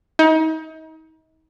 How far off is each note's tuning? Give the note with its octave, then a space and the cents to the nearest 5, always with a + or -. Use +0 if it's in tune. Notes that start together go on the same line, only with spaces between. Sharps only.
D#4 +35